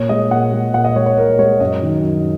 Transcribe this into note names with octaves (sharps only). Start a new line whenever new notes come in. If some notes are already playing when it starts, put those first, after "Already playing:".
Already playing: A#2 C#5
G#3 D#5
A#2 F#5
G#3
A#2 F#5
D#5
G#3 C#5
C#5
A#2 A#4
G#3 C#5
F#2 D#5
D#3 F#3
F#2